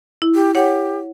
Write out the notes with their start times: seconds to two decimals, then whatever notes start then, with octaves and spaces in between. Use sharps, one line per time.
0.22 E4
0.35 G4
0.55 G4 C#5 F#5